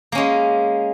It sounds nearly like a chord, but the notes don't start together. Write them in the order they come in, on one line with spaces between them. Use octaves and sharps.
A#3 C#4 G#3